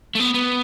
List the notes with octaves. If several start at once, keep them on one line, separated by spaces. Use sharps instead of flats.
A3
B3
B3